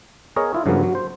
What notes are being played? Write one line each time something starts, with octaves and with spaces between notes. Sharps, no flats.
B3 G#4 A#4 C#5 D#5
E4 F4
G2 C#3 F3 F#3 A#3 B3
F#3
C5